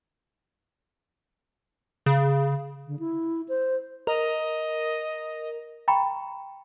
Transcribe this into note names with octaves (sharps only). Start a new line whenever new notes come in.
C#3
D3
E4
C5
A#4 D#5
G5 A#5 B5 C#6